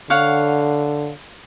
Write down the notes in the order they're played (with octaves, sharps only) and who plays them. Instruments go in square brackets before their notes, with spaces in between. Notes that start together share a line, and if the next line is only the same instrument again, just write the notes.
[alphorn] D3 [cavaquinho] C#5 F5 F#5